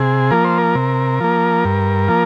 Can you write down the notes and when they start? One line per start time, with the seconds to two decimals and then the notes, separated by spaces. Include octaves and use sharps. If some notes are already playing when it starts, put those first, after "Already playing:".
Already playing: C3 G#4
0.31 F3 A#3 A#4
0.44 C5
0.58 A#4
0.75 C3
1.20 F3 A#3
1.65 G2
2.08 F3 A#3